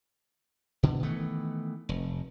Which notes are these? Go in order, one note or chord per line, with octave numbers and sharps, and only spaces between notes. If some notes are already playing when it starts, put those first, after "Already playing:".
B2 D3
D#3 E3 A3 B3
F1